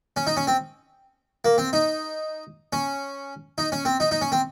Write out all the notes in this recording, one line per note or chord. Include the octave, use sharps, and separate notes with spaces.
C#4
D#4
C#4
C4
A#3
C4
D#4
C#4
D#4
C#4
C4
D#4
D#4
C#4
C4